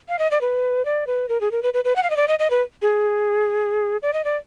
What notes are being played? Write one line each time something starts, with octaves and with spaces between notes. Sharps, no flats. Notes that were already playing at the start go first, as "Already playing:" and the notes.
F5
D#5
D5
B4
D5
B4
A#4
G#4
A#4
B4
B4
B4
F#5
F5
D#5
D5
D#5
D#5
B4
G#4
D5
D#5
D5